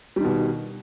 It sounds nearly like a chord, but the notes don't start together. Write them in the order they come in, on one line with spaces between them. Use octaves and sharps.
G3 D#3 B2